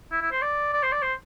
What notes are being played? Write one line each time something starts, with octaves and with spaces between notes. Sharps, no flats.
E4
E4
C5
D5
D5
C5
D5
C5